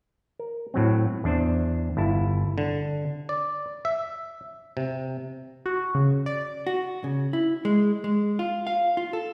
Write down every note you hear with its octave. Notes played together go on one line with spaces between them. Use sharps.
A#4
A2 F#3 C4
E2 D4 C5
G1 E4 A5
D3
D5
E5
C3
F#4
C#3
D5
F#4
C#3
E4
G#3
G#3
F4
F5
F4
A4